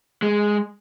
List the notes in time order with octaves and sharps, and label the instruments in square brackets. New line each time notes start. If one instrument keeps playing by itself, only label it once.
[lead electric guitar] G#3